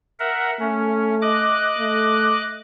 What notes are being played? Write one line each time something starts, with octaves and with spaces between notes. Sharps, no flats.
A#4 E5 F#5
A3 C#4
D#5 D6 F#6
A3